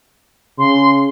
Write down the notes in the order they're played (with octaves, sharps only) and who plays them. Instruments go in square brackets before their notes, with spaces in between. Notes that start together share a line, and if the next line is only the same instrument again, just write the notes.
[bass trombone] C#3 [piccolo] C6